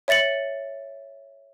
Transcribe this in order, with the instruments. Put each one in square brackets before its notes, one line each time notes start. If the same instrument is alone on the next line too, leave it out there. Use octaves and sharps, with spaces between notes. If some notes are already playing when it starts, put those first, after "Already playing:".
[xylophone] C#5 E5 A6 C#7 F#7